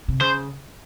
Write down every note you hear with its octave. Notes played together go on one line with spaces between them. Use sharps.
C3
C#3 C5